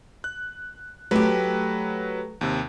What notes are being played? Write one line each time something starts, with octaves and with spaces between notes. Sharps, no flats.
F#6
F#3 A3 G4 B4
D#2 C3